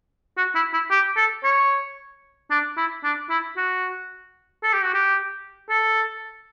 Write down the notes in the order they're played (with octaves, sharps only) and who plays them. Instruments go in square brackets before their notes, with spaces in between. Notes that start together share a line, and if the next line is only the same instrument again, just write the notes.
[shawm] F#4
E4
E4
G4
A4
C#5
D4
E4
D4
E4
F#4
A4
G4
F#4
G4
A4